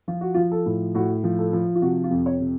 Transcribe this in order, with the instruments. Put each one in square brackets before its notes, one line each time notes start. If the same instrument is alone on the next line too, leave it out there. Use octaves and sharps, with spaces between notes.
[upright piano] F3 F4
F#4
F3 F4
A4
A2
A2 F#4
F3
A4
F3
F4
C3 F#4
F4
F2
C#5
C3